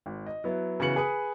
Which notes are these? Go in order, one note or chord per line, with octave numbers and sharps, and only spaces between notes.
G#1
D#5
F#3 B3 E4
C#3 E3 B3 F#4 C#7 F#7
G#4 B4 B5 D#6 C#7